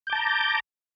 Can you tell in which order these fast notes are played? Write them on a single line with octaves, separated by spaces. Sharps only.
G6 D6 A5 A#5